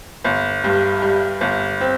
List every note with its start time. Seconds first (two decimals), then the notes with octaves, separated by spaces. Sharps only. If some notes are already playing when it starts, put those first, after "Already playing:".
0.24 G1
0.64 G2
1.02 G3
1.41 G1
1.80 C4